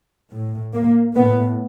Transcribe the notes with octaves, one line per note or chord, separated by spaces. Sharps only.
A2
A#3
A2 B3